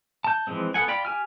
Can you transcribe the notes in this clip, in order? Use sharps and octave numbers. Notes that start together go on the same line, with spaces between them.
A5 G6
E3 F3 G#3 C4
B3 A4 F#5 G#5
F4 D5 G5 B5
G4 G#5 F6